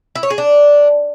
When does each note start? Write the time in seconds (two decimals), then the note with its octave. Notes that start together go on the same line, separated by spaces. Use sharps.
0.15 E4
0.23 C#5
0.30 G#4
0.38 D4